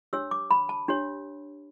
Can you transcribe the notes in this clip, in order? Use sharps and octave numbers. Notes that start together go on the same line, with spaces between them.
D4 G4 C#5 E6
D6
B5
A5
D4 G4 C#5